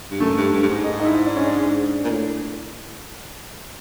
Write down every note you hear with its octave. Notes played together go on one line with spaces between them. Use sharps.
G2
F#2 A3
G2
G2
G2
G#2
D#4
D#4
E4
D4
C#4
D4
A#2
A2